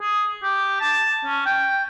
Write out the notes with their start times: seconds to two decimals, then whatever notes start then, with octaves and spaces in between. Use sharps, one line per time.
0.01 G#4
0.43 G4
0.80 A5
1.25 C#4
1.46 G5